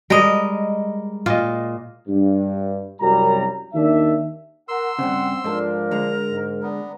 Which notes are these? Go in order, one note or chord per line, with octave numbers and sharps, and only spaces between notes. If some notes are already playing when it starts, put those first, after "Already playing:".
G3 G#3 A#4 D#5
A#2 F4 D#5
G2
C2 F#2 G3 A#5
D#2 D#3 D4 E5
A#4 F#5 C6 E6
G2 A#2 C#3 C4 F#5
G#2 F3 D4 A4 A#4 A5
D3 G#3 A#5
G#2
B3 D4 A#5